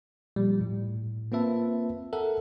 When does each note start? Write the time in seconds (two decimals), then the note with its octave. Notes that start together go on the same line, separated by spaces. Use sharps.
0.36 A#2 F3 G3
0.61 A2
1.32 A#3 C4 F4 B4 E5 A5
2.13 A4 A#4 E5 F#5